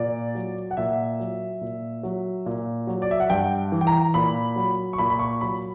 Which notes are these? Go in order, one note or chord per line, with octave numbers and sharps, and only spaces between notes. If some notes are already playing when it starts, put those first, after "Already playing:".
Already playing: A#2 D5
F#3
F#5
A#2 E5
F#3
A#2
F#3
A#2
F#3
D5
E5
F#5
G2 G5
E3
G5
A#5
A#2 B5
F#3
C#6
A#2 B5
B5
C#6
F#3 B5